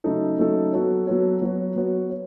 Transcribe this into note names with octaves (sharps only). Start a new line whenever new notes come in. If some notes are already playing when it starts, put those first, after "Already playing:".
C#3 F#3 A3 D#4 A4
C#3 F#3 A3 D#4 A4
F#3 B3 F#4 A4 C#5
F#3 B3 F#4 A4 C#5
F#3 B3 F#4 C#5
F#3 B3 F#4 C#5
C#5